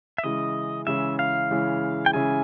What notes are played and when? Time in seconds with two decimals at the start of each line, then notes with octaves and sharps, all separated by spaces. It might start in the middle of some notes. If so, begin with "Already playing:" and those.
0.18 E5
0.24 C#3 E3 G#3 C#4 E4 D#5
0.87 C#3 E3 G#3 C#4 E4 E5
1.19 F5
1.51 C#3 E3 G#3 C#4 E4
2.06 G5
2.13 C#3 E3 G#3 C#4 E4 G#5